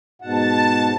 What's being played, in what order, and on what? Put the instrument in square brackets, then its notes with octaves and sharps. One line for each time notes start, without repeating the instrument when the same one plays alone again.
[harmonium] G#2 B2 F#5 [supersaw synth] A5